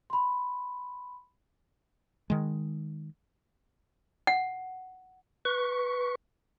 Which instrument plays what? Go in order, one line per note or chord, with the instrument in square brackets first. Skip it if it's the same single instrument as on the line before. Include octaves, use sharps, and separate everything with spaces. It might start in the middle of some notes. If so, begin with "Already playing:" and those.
[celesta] B5 C6
[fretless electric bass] D#3 G#3
[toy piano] F#5
[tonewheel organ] B4 C#6